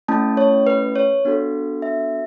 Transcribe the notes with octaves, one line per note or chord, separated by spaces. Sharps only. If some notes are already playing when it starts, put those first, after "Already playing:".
A3 C#4 E4 A5
C#5
B4
C#5
B3 D4 F#4 A4
E5